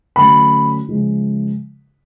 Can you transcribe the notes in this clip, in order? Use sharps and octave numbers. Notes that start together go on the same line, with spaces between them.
D3 F#3 A3 C#4 B5
C#3 F3 G#3